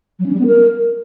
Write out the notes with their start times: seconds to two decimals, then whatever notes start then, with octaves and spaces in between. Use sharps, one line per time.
0.19 F#3
0.26 C#4
0.33 G3
0.40 B3
0.47 A#4